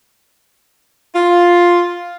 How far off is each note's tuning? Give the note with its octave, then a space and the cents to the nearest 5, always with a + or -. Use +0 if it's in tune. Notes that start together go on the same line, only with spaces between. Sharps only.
F4 +5